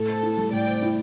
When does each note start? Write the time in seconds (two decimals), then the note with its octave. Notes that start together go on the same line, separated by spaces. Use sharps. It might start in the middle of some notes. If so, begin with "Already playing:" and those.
Already playing: A2 A4
0.08 C5
0.23 E4
0.37 G3
0.52 A2 D5 G5
0.67 C5
0.82 E4